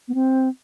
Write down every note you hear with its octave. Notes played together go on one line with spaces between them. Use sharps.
B3
C4